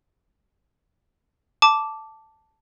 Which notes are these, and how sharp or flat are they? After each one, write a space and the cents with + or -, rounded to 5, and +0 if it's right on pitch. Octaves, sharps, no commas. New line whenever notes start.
A5 +0 D6 -5